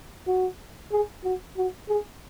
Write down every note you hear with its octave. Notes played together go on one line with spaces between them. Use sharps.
F#4
G#4
F#4
F#4
G#4